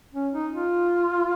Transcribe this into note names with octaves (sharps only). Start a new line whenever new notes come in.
C#4
D#4
F4